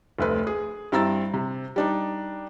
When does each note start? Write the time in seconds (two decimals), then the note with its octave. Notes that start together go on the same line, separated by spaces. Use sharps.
0.19 F1 D2 B4
0.47 G#4
0.92 G2 C4 E4 A#5 E6 A6
1.34 C3
1.76 G3 D4 D#4